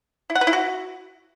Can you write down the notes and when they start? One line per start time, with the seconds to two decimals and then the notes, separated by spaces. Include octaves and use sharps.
0.30 E4
0.35 F#5
0.41 B4
0.47 E4
0.53 F#4